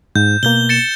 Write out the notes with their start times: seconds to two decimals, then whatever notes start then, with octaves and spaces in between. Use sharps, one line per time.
0.15 G#2 G6
0.43 B2 A#3 G6 G7
0.69 A6 C#7 E7